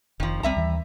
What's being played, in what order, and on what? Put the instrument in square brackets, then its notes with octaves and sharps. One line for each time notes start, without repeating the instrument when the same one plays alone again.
[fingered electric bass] F1 [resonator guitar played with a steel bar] D#3 F3
[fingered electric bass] C2 C4 [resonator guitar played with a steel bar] G3 E5 A#5
[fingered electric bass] D#2 E3